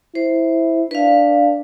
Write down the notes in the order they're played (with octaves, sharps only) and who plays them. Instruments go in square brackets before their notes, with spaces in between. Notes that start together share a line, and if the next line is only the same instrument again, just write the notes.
[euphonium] E4 [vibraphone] C5
[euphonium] D4 [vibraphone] B4 F5